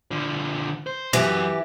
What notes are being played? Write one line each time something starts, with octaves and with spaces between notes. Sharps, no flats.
D3 F3
C5
F#2 E3 G4